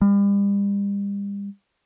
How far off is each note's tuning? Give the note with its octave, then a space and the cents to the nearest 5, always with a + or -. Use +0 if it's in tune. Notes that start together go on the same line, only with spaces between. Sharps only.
G3 +40